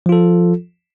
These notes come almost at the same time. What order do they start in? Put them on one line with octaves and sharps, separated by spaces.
F3 F4 A4